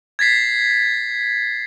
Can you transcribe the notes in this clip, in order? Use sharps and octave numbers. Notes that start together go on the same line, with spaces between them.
G#6 A6 B6 C7